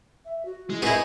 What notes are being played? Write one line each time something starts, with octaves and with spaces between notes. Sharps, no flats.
E5
F#4
G#3 E4
B3 C4 D#4 E4 G#4 A#4 C#6